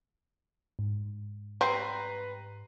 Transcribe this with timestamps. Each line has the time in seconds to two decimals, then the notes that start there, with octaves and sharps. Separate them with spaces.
0.79 G#2
1.61 G3 C4 B4 A#5 C7